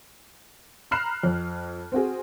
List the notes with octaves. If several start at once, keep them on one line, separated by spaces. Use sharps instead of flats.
A#5 B5 F6 F#6 C7 E7
F2
C4 F#4 G#4